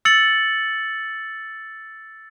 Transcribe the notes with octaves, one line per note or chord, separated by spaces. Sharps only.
E6 A6 C#7 F#7